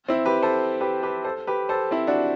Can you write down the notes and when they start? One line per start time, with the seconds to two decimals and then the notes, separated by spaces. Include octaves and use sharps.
0.08 C4 E4
0.26 G4 B4
0.42 A4 C5
0.81 G4 B4
1.03 G4 B4
1.25 A4 C5
1.47 G4 B4
1.69 A4 C5
1.91 C4 E4
2.07 D4 F#4